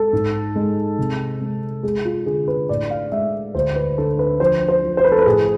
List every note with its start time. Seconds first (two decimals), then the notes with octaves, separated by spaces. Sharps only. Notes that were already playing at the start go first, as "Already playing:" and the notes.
Already playing: G#3 A4
0.13 G#2
0.55 G#3
0.98 C3
1.41 G#3
1.83 G#3 G#4
2.05 F4
2.26 D3 G#4
2.48 B4
2.69 A2 D5
2.90 F5
3.11 G#3 E5
3.54 D2 C5
3.76 B4
3.98 D3 A4
4.19 B4
4.40 F3 C5
4.69 C5
4.83 F3
4.97 C5
5.05 B4
5.12 A4
5.19 B4
5.26 A2 G#4